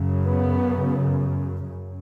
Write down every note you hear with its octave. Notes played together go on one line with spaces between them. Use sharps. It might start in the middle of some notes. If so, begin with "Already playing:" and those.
Already playing: F#2 C#3
B3
F#2